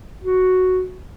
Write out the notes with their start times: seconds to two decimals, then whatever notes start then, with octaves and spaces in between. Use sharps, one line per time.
0.24 F#4